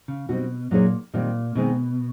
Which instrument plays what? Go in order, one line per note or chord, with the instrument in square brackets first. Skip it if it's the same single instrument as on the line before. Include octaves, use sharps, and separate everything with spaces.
[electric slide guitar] C#3
[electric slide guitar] B2 [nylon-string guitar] G3 C4 D#4 F#4
[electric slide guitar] A#2 [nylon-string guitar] F#3 A#3 D#4 G#4 C#5
[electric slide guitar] A#2 [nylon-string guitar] D#3 G3 C4
[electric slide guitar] B2 [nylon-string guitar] D#3 G#3 C4 D#4